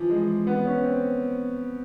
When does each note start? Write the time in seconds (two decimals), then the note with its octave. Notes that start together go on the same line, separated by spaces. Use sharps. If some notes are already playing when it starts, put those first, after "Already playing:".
Already playing: E3 F3
0.10 G#3
0.47 B3
0.65 C#4
0.84 C4